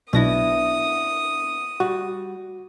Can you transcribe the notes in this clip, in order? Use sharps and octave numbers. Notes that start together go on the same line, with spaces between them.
B1 B3 D4 E4 D#6 A#6
G3 F#4